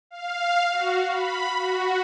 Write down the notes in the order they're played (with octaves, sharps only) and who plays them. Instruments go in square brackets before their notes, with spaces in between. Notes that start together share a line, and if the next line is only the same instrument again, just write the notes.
[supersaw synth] F5
F#4
B5
F#4